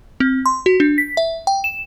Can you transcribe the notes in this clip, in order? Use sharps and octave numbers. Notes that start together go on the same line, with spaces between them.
C4
C6
F#4
D4
B6
E5
G5
E7